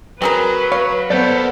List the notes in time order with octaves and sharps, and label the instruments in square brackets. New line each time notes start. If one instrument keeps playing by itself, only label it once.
[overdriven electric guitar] F#3 [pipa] C4 G#4 A#4 [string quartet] B4
[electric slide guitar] C#5 [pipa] F5
[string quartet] B3 [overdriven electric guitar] A4 A#4 [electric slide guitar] C5 D5